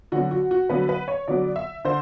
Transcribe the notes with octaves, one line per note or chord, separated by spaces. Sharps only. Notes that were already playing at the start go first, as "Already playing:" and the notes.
D3 F#3 B3 F#4
F#4
F#4
D3 F#3 B3 B4
B4
C#5
D3 F#3 B3 D5
E5
D3 C5